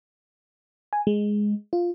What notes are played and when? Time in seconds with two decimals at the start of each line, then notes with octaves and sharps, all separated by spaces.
0.93 G#5
1.07 G#3
1.73 F4